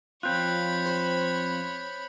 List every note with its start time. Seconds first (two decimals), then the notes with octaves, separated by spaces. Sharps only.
0.23 F2 C4 F4 C#5 B5 F#6 G6
0.86 C5